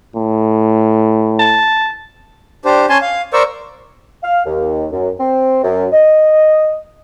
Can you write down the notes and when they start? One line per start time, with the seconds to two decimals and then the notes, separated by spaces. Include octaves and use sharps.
0.16 A2
1.39 A5
2.65 D4 G4 C5
2.89 C#4 G#5 A5 C6
3.02 F5
3.33 A#4 C5 D5 C#6 E6
4.23 F5
4.45 D#2
4.92 F#2
5.19 C4
5.63 F#2
5.93 D#5